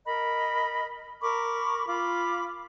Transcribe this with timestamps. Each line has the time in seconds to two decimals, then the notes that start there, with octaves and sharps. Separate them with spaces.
0.05 A#4 D#5 B5
1.21 A#4 B5 C#6 D6
1.87 F4 B5 D6